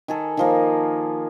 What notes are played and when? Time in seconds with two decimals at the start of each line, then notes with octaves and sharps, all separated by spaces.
0.08 D#3 G#4 A4
0.37 D#3 F3 A#3